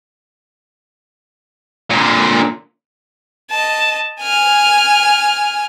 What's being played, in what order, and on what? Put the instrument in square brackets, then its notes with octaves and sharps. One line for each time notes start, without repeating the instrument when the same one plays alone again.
[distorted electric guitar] A#2 D3
[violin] D#5 A5
G#5 F6